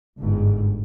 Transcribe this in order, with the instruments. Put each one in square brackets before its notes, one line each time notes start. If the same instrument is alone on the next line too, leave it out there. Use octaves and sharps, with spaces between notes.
[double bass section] G1 G#2